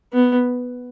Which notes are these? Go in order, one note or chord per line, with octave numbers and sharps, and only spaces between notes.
B3